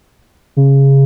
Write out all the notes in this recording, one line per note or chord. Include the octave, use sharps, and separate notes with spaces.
C#3